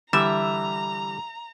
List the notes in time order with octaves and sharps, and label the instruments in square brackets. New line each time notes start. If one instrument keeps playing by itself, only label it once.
[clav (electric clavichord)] D3 E3 G3 [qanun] E5 [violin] A#5